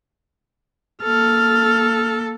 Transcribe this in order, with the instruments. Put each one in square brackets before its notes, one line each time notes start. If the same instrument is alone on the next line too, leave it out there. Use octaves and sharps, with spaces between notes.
[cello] A#3 A4 [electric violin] F6